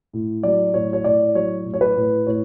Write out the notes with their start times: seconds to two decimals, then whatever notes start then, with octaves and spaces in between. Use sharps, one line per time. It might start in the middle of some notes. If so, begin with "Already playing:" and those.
0.13 A2
0.43 F#3 D5
0.74 A2 C#5
0.93 C#5
1.04 A2 D5
1.35 F#3 C#5
1.65 A2
1.74 C#5
1.81 B4
1.96 A2
2.27 A2 C#5